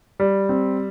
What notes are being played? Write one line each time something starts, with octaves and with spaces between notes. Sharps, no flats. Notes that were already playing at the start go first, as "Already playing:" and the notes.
G3
C4